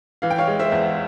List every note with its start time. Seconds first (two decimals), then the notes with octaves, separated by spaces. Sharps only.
0.22 E3 F5
0.30 G5
0.38 C#5 F5
0.47 G#3
0.59 C5 E5
0.72 E2